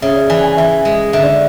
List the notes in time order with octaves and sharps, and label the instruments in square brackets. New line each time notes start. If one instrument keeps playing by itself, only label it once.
[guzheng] C#3 [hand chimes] E5
[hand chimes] D5
[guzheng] E3 [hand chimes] G#5
[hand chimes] G#5
[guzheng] E3 [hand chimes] E5
[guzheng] G#3
[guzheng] D3 [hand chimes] E5
[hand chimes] D5